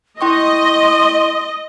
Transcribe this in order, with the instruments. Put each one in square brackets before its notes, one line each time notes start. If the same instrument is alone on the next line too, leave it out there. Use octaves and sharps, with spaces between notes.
[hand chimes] E4 G5 C#6 [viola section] D#5 [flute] C6